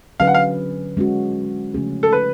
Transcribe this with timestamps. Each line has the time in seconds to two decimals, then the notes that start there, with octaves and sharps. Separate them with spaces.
0.20 D3 F#3 C#4 G#4 B4 F5
0.27 F#5
0.34 F5
0.97 G#3 C#4 F#4
1.74 C#3 F3 A3 C#4 G#4
2.03 A4
2.12 B4